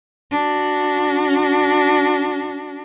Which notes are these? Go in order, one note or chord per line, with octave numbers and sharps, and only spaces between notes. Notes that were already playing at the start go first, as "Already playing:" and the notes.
D4 F#4